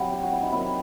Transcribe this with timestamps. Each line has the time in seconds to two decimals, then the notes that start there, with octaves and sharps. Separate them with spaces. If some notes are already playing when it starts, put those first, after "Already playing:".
Already playing: C3 F#3 E4
0.12 G4
0.23 F#4
0.33 E4
0.42 D#4
0.52 C3 D#3 F#3 E4